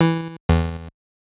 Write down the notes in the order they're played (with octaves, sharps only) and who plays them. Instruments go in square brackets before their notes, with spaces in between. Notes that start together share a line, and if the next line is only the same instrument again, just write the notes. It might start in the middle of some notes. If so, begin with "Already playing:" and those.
[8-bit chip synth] E3
E2